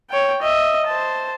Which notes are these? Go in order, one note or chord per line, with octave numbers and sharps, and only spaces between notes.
C#5 G5
D#5 E5
C5 A5